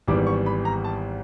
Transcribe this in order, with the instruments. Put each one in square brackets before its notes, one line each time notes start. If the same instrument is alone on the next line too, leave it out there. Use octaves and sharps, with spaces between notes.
[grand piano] G#1 G#2 E3 G3 B3 D6
C#6
B5
A#5
A5